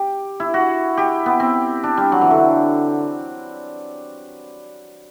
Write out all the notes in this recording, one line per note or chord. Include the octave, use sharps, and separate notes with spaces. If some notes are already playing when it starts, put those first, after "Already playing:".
Already playing: G4
E4
F#4
G4
B3
C4
D4
G3
F#3
E3
D3